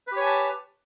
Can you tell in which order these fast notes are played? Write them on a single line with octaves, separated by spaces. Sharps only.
B4 G4 C#5 G#5 A5